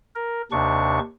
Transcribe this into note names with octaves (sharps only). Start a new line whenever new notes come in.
A#4
D#2 C3 D4 C#6